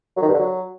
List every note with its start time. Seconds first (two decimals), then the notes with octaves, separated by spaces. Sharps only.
0.17 F#3
0.22 D#3
0.28 G2
0.34 D3
0.39 F#3